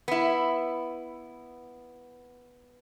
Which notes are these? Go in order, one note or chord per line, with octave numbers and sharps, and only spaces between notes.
B3 E4